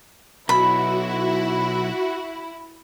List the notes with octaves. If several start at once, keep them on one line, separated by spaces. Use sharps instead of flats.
B1 E4 F#4 B5